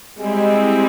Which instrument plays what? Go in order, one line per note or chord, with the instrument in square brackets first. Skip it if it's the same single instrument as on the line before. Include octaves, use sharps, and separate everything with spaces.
[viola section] G3 C4 E4 [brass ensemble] G#3